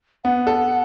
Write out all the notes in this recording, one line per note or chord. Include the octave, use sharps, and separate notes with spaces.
B3 F#5
A4